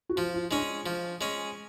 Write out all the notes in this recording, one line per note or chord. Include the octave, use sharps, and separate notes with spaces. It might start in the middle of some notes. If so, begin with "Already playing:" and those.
F#4
F3 F4
F4
G#3 C#4 D4
F3
G#3 C#4